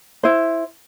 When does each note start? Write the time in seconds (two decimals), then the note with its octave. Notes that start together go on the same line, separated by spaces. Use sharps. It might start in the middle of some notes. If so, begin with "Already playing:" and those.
0.23 E4 C5